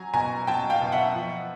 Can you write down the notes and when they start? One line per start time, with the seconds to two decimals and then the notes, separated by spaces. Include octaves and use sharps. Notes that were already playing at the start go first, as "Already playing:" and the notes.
Already playing: F#3 G#5 A#5
0.14 B2 G#5 A#5
0.47 F#3 G5 A5
0.70 F5 G5
0.82 B2
0.92 E5 F#5
1.15 F3